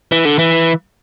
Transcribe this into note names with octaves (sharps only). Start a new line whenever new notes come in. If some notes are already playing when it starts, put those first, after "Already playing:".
E3
D3
E3